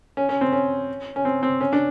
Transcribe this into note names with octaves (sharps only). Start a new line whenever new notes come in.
C#4
C#4
C4
C#4
C#4
C4
C4
C#4
D4